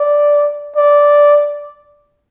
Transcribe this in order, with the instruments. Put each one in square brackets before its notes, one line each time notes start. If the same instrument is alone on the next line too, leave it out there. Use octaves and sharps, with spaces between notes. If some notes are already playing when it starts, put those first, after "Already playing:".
Already playing: [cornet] D5
D5